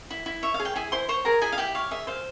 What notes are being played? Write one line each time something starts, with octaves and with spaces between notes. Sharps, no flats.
E4
E4
C#5 E5
F5
G#4
G5
E4 G#4 G#5
E4 C5 C6
C5 C#5 C6
G#4 A#4 A#5
E4 G#4 G#5
F5
E4 G4 G5
C#5 F5
G#4 E5
C5 F5